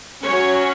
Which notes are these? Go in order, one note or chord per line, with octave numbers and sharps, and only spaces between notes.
F#3 C#4 C#5